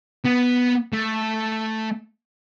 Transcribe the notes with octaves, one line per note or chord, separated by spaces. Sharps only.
B3
A3